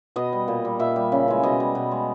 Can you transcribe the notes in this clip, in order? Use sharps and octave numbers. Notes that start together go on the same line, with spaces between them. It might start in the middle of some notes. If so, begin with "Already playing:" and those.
B2 D#5
G3
A#2
G3
A#2 E5
G3
C#3
E3 G#3
B2 D#5
G3
B2
G#3